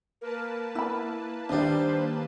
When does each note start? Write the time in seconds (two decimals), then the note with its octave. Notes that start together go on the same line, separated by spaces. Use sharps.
0.21 A#3 A#4 B4 A5
0.75 E4 B5
1.49 D#2 G3 D4 C5